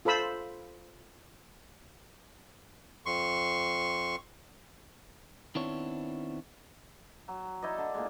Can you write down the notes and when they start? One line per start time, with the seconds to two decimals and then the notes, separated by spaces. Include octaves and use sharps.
0.05 F4 A4 C5 B5 E6
3.06 F2 C6 C#6
5.55 D#3 B3 C4 D4 E4 C#5
7.28 F#3
7.62 D#4 E4 D5 D#5
7.78 D3
7.94 A#2 G#3